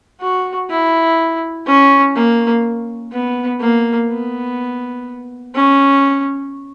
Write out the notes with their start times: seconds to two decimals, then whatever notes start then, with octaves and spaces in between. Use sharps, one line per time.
0.21 F#4
0.70 E4
1.67 C#4
2.15 A#3
3.12 B3
3.61 A#3
4.09 B3
5.55 C#4